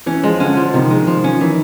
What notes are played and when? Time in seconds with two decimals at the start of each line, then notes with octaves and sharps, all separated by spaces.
0.06 E3 C#4
0.24 F3 G#3
0.40 D3 C#4
0.57 F3
0.74 C3 D#3
0.91 G#3
1.07 F3
1.24 C#4
1.41 D#3 E3